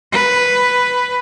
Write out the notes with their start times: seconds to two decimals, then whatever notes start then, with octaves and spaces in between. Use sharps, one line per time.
0.12 B4